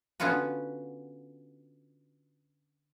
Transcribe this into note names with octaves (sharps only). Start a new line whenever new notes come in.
D3 B3 C#4 F4 F#4 B4